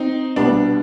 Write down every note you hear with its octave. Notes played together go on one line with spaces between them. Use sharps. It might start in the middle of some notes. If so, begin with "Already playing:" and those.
Already playing: C4 D#4
C2 B2 G3 B3 D4